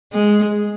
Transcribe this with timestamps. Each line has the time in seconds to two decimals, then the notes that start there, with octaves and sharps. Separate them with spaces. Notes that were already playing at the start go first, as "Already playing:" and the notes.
0.13 G#3